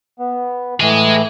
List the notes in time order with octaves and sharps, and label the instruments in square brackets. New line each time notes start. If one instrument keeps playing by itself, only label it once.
[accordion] B3
[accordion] A2 E3 [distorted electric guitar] G#4 D#5